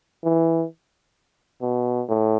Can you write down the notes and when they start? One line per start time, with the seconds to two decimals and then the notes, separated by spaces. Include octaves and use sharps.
0.24 E3
1.62 B2
2.09 A2